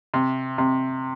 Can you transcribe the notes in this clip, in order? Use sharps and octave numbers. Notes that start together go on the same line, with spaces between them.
C3
C3